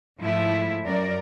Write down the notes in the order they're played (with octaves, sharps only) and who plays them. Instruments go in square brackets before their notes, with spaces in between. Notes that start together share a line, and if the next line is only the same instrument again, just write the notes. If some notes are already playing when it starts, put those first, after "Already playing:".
[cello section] G#2 F3 A3 E4
F#2 A#4 D5